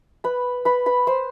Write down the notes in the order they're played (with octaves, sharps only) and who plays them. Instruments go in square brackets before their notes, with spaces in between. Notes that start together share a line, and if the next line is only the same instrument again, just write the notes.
[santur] B4 B5
B4 B5
B4 B5
C5 C6